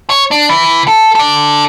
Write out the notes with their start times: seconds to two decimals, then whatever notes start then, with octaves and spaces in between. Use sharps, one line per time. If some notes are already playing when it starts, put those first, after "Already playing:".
0.10 C#5
0.31 D4
0.49 E3
0.87 A4
1.15 A4 D5